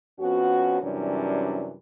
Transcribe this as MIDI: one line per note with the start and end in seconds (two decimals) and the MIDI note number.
0.20 0.81 41
0.20 0.81 59
0.20 0.81 61
0.20 0.81 66
0.82 1.75 42
0.82 1.75 48
0.82 1.75 52
0.82 1.75 55
0.82 1.75 61
0.82 1.75 62